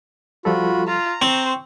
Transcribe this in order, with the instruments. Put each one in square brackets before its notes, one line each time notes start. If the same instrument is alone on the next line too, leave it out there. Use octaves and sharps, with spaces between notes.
[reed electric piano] F3 G3 A4 [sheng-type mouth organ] F4 F#4 B5
[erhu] F4 [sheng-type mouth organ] A#5
[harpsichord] C4 [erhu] C5 [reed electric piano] C#6